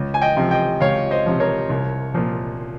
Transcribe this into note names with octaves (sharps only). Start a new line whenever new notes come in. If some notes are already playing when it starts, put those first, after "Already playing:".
Already playing: C#2
G#5
D#5 G5
C3 F3
D#5 G5
C#2 C#5 F5
C5 D#5
C3 F3
A#4 C#5
C2
A#2 F3